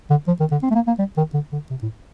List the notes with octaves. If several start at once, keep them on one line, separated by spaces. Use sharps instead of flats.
D3
F3
D#3
D3
C4
A3
A#3
A#3
G3
D#3
D3
D3
C3
A2